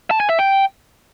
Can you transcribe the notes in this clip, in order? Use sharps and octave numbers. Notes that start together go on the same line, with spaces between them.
A5
G#5
E5
G5